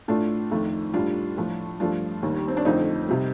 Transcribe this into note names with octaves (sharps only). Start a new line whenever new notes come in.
A2 A3 D4 F4
F2 D#3 A3
A2 G3 D4 F4
A2 F3 A3
G2 F3 A3 D4 F4
D#2 D#3 G3
C4
D4
F2 D3 A3 C4 D#4
C3 G3